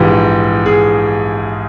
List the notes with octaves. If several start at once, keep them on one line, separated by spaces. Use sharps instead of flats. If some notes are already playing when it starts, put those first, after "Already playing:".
Already playing: A#1 G#2 E3 G4
G#4